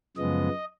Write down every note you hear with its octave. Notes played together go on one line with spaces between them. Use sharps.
F#2 C#3 F3 G#3 B3 D#5